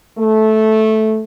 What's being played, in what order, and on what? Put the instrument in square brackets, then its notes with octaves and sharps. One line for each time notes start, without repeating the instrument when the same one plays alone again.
[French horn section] A3